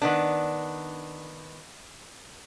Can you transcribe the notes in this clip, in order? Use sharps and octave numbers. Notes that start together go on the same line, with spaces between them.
D#3 B3 D4